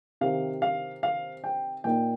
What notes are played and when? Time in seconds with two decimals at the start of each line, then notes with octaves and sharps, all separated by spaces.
0.21 C3 D#3 C4 F5
0.62 F5
1.03 F5
1.44 G5
1.84 A#2 A#3 D#4 G5